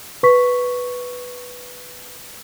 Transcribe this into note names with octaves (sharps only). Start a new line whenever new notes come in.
B4 C#6 B6